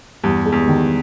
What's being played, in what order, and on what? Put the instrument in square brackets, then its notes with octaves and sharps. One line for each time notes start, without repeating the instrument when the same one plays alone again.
[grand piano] E2 [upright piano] G2
[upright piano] G#3
[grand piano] E2
[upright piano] D#3